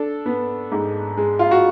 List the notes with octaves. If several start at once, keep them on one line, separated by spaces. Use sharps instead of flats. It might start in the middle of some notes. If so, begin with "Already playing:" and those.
Already playing: D4 A4
B3
G#2
G#3
F4
F#4